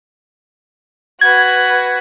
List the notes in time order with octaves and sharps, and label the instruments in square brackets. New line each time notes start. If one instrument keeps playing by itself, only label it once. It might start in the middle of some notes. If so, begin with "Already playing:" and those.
[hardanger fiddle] F#4 B4 [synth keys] G#6